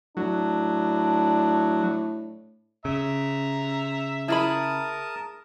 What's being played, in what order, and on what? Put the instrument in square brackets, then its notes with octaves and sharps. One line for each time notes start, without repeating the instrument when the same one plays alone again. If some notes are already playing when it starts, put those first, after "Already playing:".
[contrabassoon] A2 [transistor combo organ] F#3 [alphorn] D4
[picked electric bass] C#3 [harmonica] E5 A#5
[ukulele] E4 G#4 B5 [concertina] A#4 A5 D#6